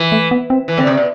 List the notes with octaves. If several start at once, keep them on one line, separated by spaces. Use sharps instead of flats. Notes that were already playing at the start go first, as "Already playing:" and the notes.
Already playing: E3
A3
B3
C4
E3
D3 C4
C3
B2